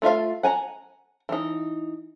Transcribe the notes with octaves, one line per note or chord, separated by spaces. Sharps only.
A3 F4 E5 F5
F#5 G#5 A#5
E3 D#4